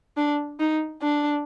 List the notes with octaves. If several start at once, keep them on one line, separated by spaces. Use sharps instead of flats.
D4
D#4
D4